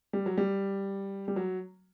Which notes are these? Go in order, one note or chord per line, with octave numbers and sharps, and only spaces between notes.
G3
F#3
G3
G3
F#3